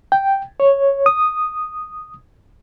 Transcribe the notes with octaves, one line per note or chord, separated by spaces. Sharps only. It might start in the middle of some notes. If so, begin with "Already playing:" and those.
G5
C#5
D#6